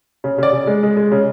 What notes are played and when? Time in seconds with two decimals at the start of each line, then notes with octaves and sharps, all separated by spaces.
0.24 C#3
0.38 C#3 D5
0.52 C#3
0.67 G#3
0.83 G#3
0.97 G#3
1.12 C#3